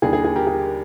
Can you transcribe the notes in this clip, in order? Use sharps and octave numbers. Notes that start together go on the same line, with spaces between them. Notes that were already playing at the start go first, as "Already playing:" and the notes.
D#2 D3 G3 G#4
G#4
G#4
G4 A#4
G#4